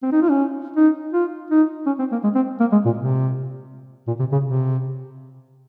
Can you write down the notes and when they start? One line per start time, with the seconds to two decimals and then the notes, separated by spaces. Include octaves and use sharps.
0.02 C4
0.12 D#4
0.22 F4
0.30 C#4
0.76 D#4
1.13 F4
1.51 D#4
1.86 C#4
1.99 C4
2.12 A#3
2.23 G#3
2.35 C4
2.60 A#3
2.72 G#3
2.85 A#2
2.97 C3
4.07 A#2
4.19 C3
4.32 C#3
4.44 C3